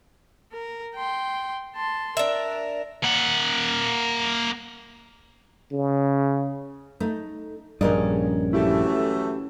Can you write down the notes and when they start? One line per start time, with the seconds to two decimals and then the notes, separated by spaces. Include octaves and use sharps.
0.52 A#4
0.95 G5 C6
1.76 A5 C6
2.17 D4 A#4 E5
3.04 A#3 F#5
5.72 C#3
7.00 A3 D#4
7.81 A#1 G2 C#4 G#4 A#4 D5 D#5
8.53 E3 F#3 A3 E4 G4 A4